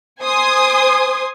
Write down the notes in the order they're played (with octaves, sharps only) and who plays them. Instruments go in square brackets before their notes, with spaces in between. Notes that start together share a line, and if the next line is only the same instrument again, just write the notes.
[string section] C5 G#5 C6 D#6